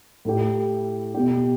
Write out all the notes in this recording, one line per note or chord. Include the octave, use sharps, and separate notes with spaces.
A2 A3 E4 G4
B2 B3 G4